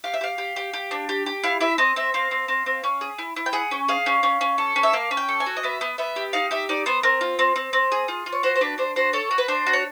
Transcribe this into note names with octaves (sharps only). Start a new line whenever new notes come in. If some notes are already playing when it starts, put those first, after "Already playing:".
G4 F5
E5
G4 F5
G4
G4
G4
D4
G4
G4
E4 F5
E4 E5
C4 D#5
C4 E5
C4 F5
C4
C4
C4
C#4
G#4
E4
E4
G5
G#4 F#5
C#4
G#4 F5
C#4
C#4
C#4
A4
C#4
E5
A#3 F5
C#4
G5
A4
G#5
F#4
D#5
B3 E5
B3
B3 E5
G4
D#4 F5
G4 E5
D#4 D5
B3 C5
C4 A#4
F4
C4
C4
C4
G#4
F4
F4
C#5
F#4 C5
C5
D4 B4
D4 C5
F#4 C5
A4 C#5
F#4
B4
D4 C5
F#4
C#5